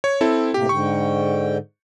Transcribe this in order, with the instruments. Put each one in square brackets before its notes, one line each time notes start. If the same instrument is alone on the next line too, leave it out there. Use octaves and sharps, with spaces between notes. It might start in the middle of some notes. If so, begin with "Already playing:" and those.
[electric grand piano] C#5
C4 E4 A4
[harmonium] A2 C3 A#3 [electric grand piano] G4
[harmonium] G#2 D3 G5 [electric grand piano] C#6